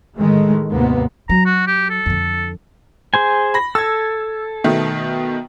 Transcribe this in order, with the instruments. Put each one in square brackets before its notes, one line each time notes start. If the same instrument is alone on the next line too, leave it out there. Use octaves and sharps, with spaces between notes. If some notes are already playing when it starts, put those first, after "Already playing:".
[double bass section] A2 D#3 G#3 A3
D#2 G#2 C3 A#3 B3
[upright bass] F#3 [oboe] A#5
[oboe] F#4
G4
A4
[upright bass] F2 D3
[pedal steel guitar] G#4 C5 G#5
[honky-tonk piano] B5 A#6
[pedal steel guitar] A4 [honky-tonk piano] E6 G#6
[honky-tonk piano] B2 D#3 A3